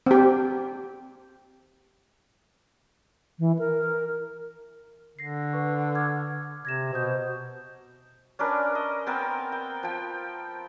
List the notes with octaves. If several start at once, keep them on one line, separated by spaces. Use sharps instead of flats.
C4 G4
E3
A#4
D3 A#6 C7
B4 F#5 C#6
D6 F6 G#6
C3 G#6 A#6 E7
B2 C5 D#6 G6
C#4 D4 A#4 B4
D#5
B3 C4 A#4 E6
G5
F3 G5